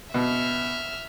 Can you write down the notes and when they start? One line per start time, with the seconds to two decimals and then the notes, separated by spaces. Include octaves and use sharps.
0.14 B2 E5 F6